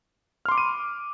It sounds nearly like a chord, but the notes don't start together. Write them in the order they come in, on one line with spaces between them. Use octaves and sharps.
F6 C6 D6 B5 D#7